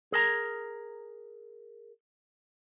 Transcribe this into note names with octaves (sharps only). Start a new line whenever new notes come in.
G#4 A#4 A5 A#5